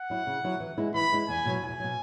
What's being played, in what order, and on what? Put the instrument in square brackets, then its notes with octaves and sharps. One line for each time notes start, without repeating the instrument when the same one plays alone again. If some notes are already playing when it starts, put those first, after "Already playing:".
Already playing: [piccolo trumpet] F#5
[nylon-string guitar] F#3 E4
C#3
F#3 E4
E3
G#3 E4
[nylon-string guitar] E3 [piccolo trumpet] B5
[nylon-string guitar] G#3 E4
[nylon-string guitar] E2 [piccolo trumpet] G#5
[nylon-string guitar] B2 F#3
[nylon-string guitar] E2 [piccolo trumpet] G#5
[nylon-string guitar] B2 F#3